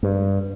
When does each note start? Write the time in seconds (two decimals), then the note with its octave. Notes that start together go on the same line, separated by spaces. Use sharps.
0.03 G2